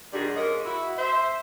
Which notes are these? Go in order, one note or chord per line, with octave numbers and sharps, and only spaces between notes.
A#2 D#3 G3 D4 F#4 G#4
G#2 A#3 C#4 D#5
E4 F#4
C5 E5